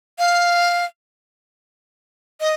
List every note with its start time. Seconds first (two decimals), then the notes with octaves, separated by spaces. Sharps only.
0.19 F5
2.40 D#5